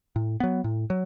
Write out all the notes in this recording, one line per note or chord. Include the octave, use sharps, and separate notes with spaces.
A2
F#3 B3
A2
F#3